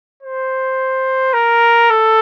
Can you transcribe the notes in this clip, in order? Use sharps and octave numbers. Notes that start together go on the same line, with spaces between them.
C5
A#4
A4